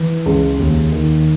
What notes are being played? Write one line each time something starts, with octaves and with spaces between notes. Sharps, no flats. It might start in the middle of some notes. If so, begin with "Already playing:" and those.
Already playing: E3
C#2
D#2
D#3